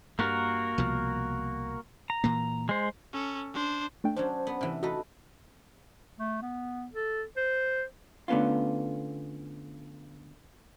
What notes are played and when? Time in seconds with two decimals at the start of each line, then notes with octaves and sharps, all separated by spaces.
0.19 G2 A#3 F#4 A#4
0.78 C2 B2 F3
2.10 A#5
2.24 A#2 E3 A#3
2.69 G#3 C5
3.13 C#4 A4
3.54 D4 C5
4.04 A3 D4 G5
4.16 F#3 C#4 D4 C5
4.47 B3
4.61 C3 E3
4.83 D#4 F#4 A4 B4
6.19 A3
6.42 B3
6.94 A4
7.37 C5
8.28 D3 A3 B3 C#4 F4